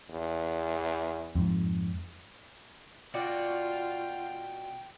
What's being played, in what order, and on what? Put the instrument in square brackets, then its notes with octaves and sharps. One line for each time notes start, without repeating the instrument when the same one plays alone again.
[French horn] E2
[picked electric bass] F2 G#2
[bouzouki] B2 F#4 D5 [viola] F4 [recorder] G5